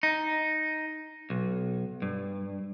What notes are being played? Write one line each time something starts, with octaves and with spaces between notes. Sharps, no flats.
D#4
B1
G2